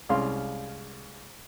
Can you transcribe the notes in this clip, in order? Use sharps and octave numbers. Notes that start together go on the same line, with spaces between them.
C2 G#3 C#4 F5 C6